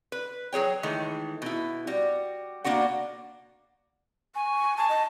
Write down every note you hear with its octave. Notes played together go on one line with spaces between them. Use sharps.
B4
F#3 G#4 C#5 G5
D#3 E3 G#3 A3
B2 E4
G3 F#4
B2 A#3 D4 F#4 F#5
G#5 C#6
G#5 A5
D#5